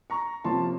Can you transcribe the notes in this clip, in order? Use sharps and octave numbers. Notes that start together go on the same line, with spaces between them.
A#5 C#6
C3 F3 A#3 C#4 A5 C6